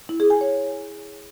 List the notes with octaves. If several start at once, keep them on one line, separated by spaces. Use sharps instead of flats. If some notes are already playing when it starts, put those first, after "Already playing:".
E4
G#4
G#5
C#5